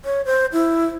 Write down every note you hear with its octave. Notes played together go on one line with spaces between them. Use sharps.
C#5
C5
E4